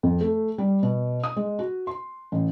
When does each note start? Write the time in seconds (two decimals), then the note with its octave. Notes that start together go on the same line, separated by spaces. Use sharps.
0.03 F2
0.21 A3
0.58 G3
0.83 B2
1.24 D#6
1.36 G#3
1.59 F#4
1.87 C6
2.32 A1